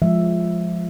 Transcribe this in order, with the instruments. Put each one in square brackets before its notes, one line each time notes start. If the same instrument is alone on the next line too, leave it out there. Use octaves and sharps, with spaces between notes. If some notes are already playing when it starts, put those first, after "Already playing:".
[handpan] F3 G#3 E5